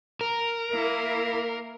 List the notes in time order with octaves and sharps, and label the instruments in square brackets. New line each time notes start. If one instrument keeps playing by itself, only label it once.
[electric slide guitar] A#4
[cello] A#3 E4